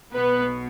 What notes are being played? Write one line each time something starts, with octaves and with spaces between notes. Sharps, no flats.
B1 B2 B3 B4